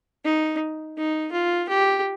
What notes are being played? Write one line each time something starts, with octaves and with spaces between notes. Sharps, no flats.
D#4
D#4
F4
G4